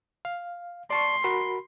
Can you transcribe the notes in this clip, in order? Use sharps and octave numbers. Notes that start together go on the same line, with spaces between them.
F5
D5 A5 C6 C#6
F#4 A#4 B5